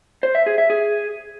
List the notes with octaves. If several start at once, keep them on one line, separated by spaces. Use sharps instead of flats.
C5
E5
G#4
E5
G#4